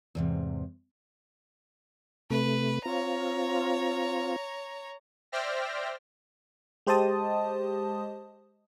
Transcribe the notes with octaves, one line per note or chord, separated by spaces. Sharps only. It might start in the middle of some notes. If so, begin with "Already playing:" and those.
E2 G#2 C3
C3 A3 B4
C4 F4 C#5 A#5
C5 D5 E5 G5 F6 A#6
G#3 G4 C5 D#5 A5 D#6